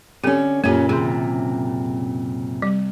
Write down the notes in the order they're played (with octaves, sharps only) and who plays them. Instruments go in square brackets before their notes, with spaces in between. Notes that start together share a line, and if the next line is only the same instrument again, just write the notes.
[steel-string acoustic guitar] D3 C#4 [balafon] C4 G4
[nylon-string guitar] F#2 A#2 C#3 [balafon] A#3 G4 [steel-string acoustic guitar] C#4
[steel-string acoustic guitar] C3 [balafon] D#3 G#4
[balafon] G3